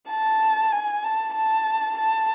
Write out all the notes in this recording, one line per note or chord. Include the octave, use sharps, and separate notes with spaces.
A5
G#5
A5
A5
A5